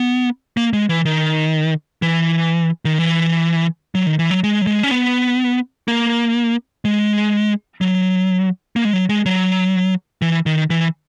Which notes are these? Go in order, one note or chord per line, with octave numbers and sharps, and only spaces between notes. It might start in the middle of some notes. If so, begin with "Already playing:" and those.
Already playing: B3
A#3
G#3
E3
D#3
E3
D#3
E3
F#3
D#3
E3
F#3
G#3
F#3
G#3
C#4
B3
A#3
G#3
F#3
A#3
G#3
F#3
G#3
F#3
E3
D#3
E3